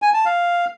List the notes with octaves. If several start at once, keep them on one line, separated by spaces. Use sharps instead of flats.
G#5
A5
F5